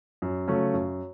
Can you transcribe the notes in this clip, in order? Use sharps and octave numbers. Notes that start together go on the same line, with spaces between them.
F#2
C#3 F#3 A3 C#4
F#2